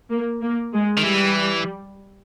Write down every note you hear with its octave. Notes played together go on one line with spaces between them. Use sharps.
A#3
A#3
G#3
D#3
E3 G3